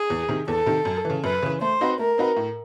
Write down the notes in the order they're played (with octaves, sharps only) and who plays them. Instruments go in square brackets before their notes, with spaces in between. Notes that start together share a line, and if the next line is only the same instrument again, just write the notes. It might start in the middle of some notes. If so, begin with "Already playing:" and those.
Already playing: [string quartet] G#4
[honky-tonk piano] E2
C3 D#3
[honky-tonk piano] E2 [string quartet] A4
[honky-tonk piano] C3 D#3
F#2
C#3 E3
[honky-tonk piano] F#2 [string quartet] B4
[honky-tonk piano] C#3 E3
[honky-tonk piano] A3 [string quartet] C5
[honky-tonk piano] C4 D#4 F#4 B4
[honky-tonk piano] A3 [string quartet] A#4
[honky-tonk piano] C4 D#4 F#4 B4
A2